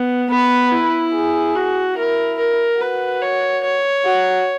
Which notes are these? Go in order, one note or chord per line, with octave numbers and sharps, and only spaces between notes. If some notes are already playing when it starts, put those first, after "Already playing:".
Already playing: B3
B3 B4
E4
G#4
F#4
E4 A#4
A#4
F#4 B4
C#5
C#5
F#4